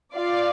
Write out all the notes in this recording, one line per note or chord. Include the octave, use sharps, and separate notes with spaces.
F4 D5 F5